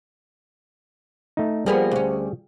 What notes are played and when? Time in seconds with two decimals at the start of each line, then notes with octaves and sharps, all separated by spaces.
1.37 A3 D#4
1.66 F3 G3 A#3 B3 G#4
1.91 D2 C#4